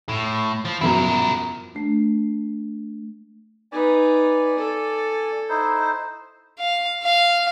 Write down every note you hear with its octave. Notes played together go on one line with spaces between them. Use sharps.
A2
F3
F#2 B2 F3 E4 A#4
A3 D4
D#4 B4 D5 G#5
A4
D#4 E4 C5
F5
F5